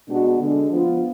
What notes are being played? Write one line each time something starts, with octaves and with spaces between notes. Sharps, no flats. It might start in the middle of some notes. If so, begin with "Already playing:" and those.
B2 G#3 B3 D4 F#4
D3 G#3 D4
F3 B3 F4